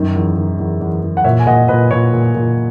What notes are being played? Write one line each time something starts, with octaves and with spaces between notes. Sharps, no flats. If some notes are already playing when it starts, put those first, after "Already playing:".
Already playing: F#2 D#3
E2
D#3
E2
E2
E2
F#5
A#2 C#5 E5
G#5
A#2 D#5 F#5
A#2 B4 D#5
A#2 C#5
A#2
A#2